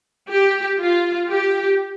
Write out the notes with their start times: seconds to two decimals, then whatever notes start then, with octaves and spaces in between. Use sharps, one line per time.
0.30 G4
0.79 F4
1.30 G4